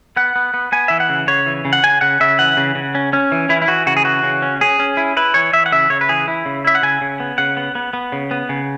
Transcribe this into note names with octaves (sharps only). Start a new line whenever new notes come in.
B3 F#5
B3
B3
B3 G#5
E3 E5
F#5
C#3
C#3 C#5
E3
C#3
F#5
C#3 G#5
C#3 F#5
C#3 E5
E3 F#5
C#3
C#3
C#4
C#4
E3
E3 E4
E4
E3 F#4
C#3 F#4
G#4
E3 F#4
C#3
C#4
C#4 G#4
C#4
E4
E4 B4
E3 C#5
E3 E5
F#5
C#3 E5
C#3 C#5
B4
E3 G#4
E4
C#3
E4 E5
F#5
C#3 G#5
C#3
B3
C#3 F#5
B3
B3
B3
C#3
B3
C#3